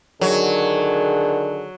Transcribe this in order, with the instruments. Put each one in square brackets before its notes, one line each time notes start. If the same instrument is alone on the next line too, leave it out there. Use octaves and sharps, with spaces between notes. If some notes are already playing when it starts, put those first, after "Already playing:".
[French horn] D3 [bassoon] D#3 [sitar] F#3 [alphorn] G#4